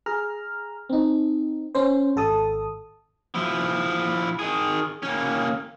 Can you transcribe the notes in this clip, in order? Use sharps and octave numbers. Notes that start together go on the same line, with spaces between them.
G#4 A#5 F6
C4 D#4
C#4 C5
G#1 A4 A5 D#6
F3 E4
D#3 G#4
A#3 C#4